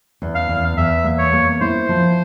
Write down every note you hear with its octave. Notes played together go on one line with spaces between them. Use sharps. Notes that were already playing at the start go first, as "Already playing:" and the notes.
E2
F5
E2
E2 E5
A#3
C#5
A#3
E4 C5
F3